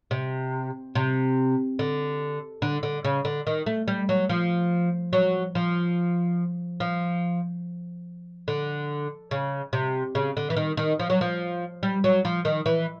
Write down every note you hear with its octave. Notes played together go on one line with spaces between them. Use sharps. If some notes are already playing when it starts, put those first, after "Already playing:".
C3
C3
D3
D3
D3
C#3
D3
D#3
A3
G3
F#3
F3
F#3
F3
F3
D3
C#3
C3
C#3
D3
E3
D#3
D#3
F3
F#3
F3
G3
F#3
F3
D#3
E3